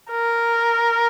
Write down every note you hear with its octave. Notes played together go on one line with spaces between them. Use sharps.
A#4